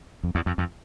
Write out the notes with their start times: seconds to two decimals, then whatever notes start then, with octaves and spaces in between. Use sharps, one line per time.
0.23 F2
0.35 E2
0.46 F2
0.58 F2